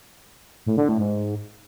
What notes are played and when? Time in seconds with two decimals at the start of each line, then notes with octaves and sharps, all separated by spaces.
0.66 A2
0.77 D3
0.89 A2
1.00 G#2